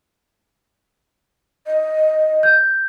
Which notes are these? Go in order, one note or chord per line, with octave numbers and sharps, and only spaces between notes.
D#5
G6